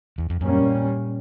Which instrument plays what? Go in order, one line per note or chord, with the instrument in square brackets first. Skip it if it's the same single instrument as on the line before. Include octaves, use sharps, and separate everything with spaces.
[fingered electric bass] E2
F2
[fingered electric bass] F#2 [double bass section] A#2 G3 A#3 C#4